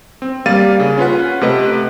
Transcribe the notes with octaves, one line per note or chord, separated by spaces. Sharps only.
C4
G3 A#3 F5 A6 D#7
C#3
C#4 F4 B4 F#5
C3 A3 B4 D#5